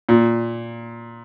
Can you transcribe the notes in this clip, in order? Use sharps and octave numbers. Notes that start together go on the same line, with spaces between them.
A#2